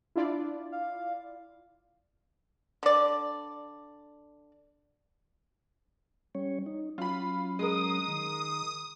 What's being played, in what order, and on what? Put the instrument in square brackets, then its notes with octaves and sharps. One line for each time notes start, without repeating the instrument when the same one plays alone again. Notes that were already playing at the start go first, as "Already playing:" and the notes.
[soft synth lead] D4 [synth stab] E4 F4 D5
[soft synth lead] F5
[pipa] D3 D5
[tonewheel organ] G3 C#4 C#5
D#4
[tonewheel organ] F#3 C#4 [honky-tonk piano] F4 B5
[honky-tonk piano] G#3 A#4 [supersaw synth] D#6
[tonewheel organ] D#3